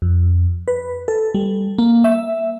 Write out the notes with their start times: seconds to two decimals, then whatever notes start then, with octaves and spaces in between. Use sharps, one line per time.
0.02 F2
0.68 B4
1.08 A4
1.34 G3
1.78 A#3
2.04 E5